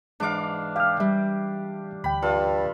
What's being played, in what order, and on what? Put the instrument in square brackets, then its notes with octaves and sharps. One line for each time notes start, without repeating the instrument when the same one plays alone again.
[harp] G#2 E3 D6 [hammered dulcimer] D4 F5
[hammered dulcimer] G4 [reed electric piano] F5 F6
[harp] G3 [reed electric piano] E5
[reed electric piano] D2 G5 [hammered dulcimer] B5
[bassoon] G2 [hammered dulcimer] F4 A4